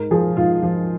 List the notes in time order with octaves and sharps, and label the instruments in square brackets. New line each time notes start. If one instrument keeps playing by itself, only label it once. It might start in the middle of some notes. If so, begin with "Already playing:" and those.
Already playing: [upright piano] G#2 A#4
F3 G#4
G#2 F4
F3